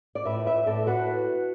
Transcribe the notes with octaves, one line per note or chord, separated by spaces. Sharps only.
D5
A2 B4 E5
B4 E5
A2 A4 D5
F#4 B4